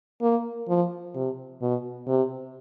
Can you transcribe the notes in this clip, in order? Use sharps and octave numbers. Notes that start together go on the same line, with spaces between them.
A#3
F3
C3
B2
C3